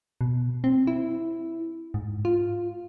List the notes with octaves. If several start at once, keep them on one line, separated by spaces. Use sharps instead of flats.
B2
C4
E4
G#2
F4